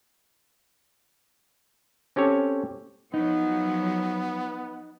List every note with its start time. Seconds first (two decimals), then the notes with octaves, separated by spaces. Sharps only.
2.16 C4 C#4 G4 A4 C#5
3.14 F3 F#3 B3 D#4